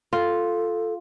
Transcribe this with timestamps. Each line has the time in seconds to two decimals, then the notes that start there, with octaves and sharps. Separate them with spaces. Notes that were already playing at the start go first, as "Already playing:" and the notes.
0.13 F4 A4